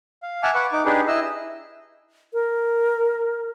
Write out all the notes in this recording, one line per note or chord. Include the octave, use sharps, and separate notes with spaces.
F5
E5 F#5 G#5 A5 D6 F6
B4 F#5 C#6 D6
D#4 D6
D4 D#4 G4 G#4 B4
E4 D#5 E6
A#4